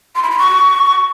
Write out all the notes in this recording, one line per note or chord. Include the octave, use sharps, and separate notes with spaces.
C6
B5
C6
C#6